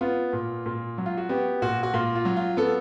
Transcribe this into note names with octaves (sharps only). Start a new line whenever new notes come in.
B3 F4
A#2
A#2
F#3
F4
F#4
B3 G4
A#2 F#4
F#4
A#2 F4
F4
F#3
F4
B3 A4